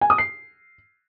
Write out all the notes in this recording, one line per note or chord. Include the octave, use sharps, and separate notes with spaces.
G#5
D#6
C7